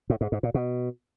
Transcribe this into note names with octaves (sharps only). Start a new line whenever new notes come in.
A2
G#2
G#2
A#2
B2